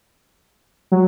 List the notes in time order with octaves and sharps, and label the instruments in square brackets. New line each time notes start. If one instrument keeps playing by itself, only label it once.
[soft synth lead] F#3